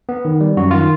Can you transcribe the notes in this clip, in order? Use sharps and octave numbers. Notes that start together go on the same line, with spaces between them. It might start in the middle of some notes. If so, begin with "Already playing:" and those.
B3
D#3
G3
F#2 F#4
D#3 F4